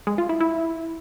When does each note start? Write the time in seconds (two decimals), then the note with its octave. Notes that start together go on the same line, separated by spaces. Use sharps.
0.07 G#3
0.18 F4
0.29 E4
0.41 E4